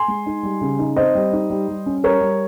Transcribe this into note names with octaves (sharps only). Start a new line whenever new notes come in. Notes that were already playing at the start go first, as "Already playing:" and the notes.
Already playing: G#5 C6
G#3
D#4
G3
C#3
D#4
C4 C5 D#5
G3
D#4
G3
G3
C#4
G3 A#4 C#5
G3